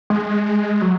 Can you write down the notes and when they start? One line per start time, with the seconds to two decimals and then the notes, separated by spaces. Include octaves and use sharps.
0.10 G#3
0.82 F#3